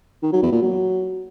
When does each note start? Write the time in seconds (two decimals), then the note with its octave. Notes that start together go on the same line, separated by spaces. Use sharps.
0.23 D#3
0.33 F#3
0.42 E2
0.52 A#2
0.62 F#3